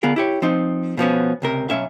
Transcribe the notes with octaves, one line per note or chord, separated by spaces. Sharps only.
D3 B3 F4 G#4 A#4
E4 G4 C#5
F3 C4 D#4
B2 F3 B3 C#4
C#2 C3 A#4
B1 G#2 C#4 E5 F5